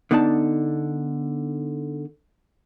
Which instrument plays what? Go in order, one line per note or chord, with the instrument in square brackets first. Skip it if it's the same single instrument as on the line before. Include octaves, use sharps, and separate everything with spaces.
[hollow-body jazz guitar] D3 B3 D#4 D5 A5